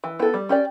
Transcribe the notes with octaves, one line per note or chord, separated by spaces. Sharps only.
E3
B3 E4 A4
G3
C#4 G4 D5